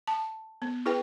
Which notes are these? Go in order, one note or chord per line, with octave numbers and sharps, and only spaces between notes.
A5
B3
E4 G#4 B4 G5